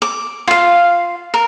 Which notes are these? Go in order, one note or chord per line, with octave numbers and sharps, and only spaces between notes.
D6
F4 F5
A#4